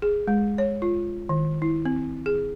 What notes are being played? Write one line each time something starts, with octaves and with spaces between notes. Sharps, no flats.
G#4
G#3
C#5
F4
D#3
E4
C4
G#4